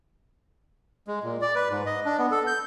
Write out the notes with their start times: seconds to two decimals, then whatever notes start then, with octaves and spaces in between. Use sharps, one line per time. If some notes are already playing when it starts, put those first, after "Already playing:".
1.08 G#3
1.23 A#2
1.41 D5
1.55 B4
1.70 G#2
1.86 D#5
2.05 D4
2.18 B3
2.31 A4
2.47 G6